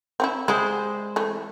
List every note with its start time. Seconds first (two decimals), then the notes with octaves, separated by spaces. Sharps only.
0.20 C4 C#4 E4
0.48 G3 G#3 E4 C5
1.16 E3 A3